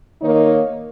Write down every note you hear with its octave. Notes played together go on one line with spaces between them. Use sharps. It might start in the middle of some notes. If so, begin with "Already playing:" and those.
D#3 A#3 D#4 A#4 C#5